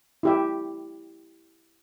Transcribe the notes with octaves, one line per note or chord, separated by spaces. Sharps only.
E4 G4 E5